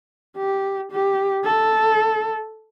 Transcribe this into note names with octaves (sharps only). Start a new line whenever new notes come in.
G4
G4
A4